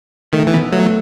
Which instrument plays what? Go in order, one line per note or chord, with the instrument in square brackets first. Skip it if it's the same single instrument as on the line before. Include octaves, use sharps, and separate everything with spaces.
[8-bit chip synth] D#3 [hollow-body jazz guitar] A3
[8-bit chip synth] E3
[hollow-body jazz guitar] B2 B3
[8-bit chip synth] F#3 [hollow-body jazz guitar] A3